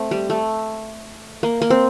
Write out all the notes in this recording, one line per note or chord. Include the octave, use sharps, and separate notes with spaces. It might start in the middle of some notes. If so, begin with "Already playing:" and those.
Already playing: A3 C4
G3
A3
A#3
A#3
C4